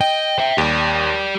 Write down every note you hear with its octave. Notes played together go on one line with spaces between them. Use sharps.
D#5 G5
C5 E5
D#2 G4 D5